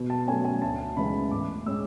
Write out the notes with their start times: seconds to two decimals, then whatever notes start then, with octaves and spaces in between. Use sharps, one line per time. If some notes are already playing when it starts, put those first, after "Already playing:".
Already playing: B2
0.10 A5
0.27 F#3 A3 C#4 G#5
0.45 G#5
0.62 D2 A5
0.97 C#3 E3 G#3 B5
1.31 A2 D6
1.66 G#3 C#4 E6